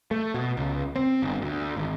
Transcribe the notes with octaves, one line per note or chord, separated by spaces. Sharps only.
A3
B2
C#2
C4
G1
D2
G#1